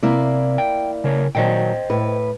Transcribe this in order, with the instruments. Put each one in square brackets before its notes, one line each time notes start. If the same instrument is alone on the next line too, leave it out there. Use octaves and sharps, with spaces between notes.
[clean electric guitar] C3 [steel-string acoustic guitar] A#3 E4 D5
[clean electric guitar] G5
C#3 A#4 C#5
[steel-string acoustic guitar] A#2 D#3 F#3 [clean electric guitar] C5 D#5 G5
[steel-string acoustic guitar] A2 B4